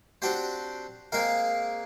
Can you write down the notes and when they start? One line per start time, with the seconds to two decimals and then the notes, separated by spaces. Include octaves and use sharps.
0.22 C4 D4 F#4 G4 C5
1.12 G#3 A#3 C4 A#4 F5